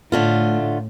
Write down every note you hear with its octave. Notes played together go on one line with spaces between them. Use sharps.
A2 D3 A3 F4